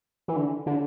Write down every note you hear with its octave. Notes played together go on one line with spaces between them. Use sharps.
E3
D3
D3